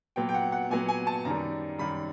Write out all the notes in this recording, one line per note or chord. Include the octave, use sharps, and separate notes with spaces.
A#2 F#3 B3 G5
G5
F#5
F#5
A#2 F#3 B3 G#5
G#5
A5
F#2 D#3 G3 A#5
F#2 D#3 G3 B5